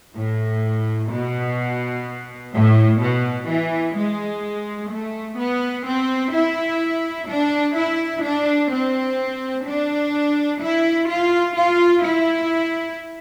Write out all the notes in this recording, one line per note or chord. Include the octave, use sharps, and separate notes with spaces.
A2
B2
A2
B2
E3
G#3
A3
B3
C4
E4
D4
E4
D4
C4
D4
E4
F4
F4
E4